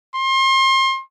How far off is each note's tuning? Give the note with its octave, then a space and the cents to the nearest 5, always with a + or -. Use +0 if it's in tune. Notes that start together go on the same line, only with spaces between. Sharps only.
C6 +35